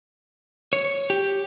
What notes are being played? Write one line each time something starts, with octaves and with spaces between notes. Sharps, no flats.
C#5
G4